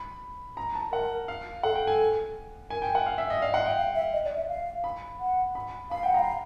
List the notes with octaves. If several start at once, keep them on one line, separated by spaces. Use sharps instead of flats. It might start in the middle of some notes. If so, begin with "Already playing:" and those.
Already playing: B5
A#5
A5
A#4 F#5
F5
A4 F#5
G5
A4
G#5
A#4 G#5
G5
F#5
F5
E5
D#5
D5 F5
D#5 F#5
E5 G5
F5
E5
D#5
D5
E5
F5
B5
F#5
B5
F5 B5
F#5 G5
F5 A#5